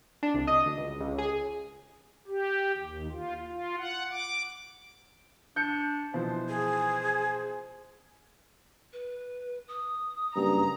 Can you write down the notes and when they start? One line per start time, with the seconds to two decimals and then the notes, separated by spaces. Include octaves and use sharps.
0.23 D4
0.34 C2
0.47 D#5
0.65 D2
0.78 C#2
1.00 C#2
1.18 G#4
2.27 G4
2.77 D#2
3.11 F4
3.47 F4
3.78 F#5
4.10 D6
5.56 D4 G6 C#7
6.14 B2 E3 F3 C5
6.49 G#4
8.93 B4
9.68 D#6
10.36 F#1 G2 A#5